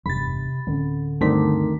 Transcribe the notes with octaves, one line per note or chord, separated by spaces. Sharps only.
F1 E2 G2 C3 B5 A6
D1 D3 C4 C#4
D2 G2 D#3 G3 A3 C4 D4 B6